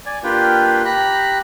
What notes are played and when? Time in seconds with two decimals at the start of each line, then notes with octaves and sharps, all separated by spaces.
0.06 D5 G#5
0.24 A#3 D4 F4 G4 B4 G5
0.85 G4 A#5 B5 F#6